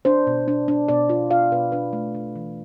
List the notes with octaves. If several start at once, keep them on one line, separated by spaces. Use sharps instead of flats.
D4 C5
B2
D4
D4
B2 D5
F4
F4 F5
B2 B4
D4 B4
A3
D4
E3